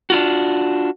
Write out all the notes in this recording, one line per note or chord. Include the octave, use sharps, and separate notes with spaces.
D4 F4 F#4